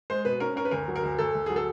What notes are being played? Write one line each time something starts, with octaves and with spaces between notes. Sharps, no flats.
G#3 C5
B2 B4
C#4 A#4
C#4 A#4
B4
D2 A#4
F#3
A#4
D2
D2 A4
D2
F#3 G#4
A4